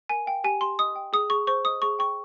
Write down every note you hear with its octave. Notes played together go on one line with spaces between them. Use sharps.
A#4 G#5
F5 G5
G4 G#5
G4 C6
D#5 D#6
G5
G#4 D#6
G#4 C#6
C5 C#6
D#5 D#6
G#4 C#6
G5 C#6